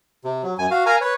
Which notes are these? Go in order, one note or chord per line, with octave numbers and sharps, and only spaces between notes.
C3
F#3
F#2 G#5
F#4 F5
A#4 F5 G#5 A#5
B4 C#5